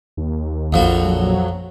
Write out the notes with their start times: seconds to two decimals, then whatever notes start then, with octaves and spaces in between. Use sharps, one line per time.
0.17 D#2
0.73 A#1 F2 F3 F#4
1.05 F#3